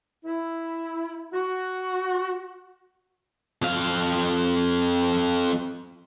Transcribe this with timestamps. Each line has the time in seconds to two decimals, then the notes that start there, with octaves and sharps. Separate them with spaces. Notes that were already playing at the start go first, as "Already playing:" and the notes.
0.24 E4
1.32 F#4
3.62 F2 F5